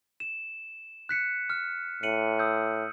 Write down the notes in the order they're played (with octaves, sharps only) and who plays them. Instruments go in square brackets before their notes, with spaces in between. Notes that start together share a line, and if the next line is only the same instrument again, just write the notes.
[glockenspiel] E7
F#6 B6 C#7
F6
[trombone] A2 [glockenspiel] C#7 D#7 F#7
[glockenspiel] D#6 E6 G6